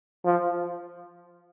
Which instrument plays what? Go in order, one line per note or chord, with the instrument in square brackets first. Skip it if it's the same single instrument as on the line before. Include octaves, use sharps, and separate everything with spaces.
[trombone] F3